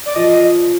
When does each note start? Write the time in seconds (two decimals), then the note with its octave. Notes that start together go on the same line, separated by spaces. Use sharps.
0.06 D5
0.15 F3 D#5